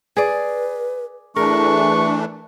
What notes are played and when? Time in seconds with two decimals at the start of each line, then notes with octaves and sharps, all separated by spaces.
0.17 G#4 B4 D5
1.36 E3 A3 D4 G#4 A#4 C#6